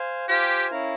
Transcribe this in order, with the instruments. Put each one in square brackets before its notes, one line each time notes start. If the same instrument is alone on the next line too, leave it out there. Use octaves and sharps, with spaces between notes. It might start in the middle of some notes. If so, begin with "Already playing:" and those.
Already playing: [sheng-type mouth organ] C5 F5 G#5
[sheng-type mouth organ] F4 C5 F5 G#5 [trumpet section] G4
[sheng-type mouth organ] C#4 E4 A#4 F5